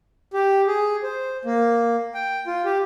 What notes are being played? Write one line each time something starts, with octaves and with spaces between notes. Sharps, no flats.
G4
G#4
C5
A#3
G5
F4
G4